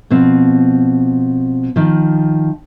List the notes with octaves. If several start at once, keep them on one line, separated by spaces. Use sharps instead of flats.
B2 F3 C4
D#3 F3